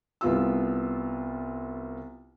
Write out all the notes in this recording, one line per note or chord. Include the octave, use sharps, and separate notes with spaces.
C2 B3 F4 E6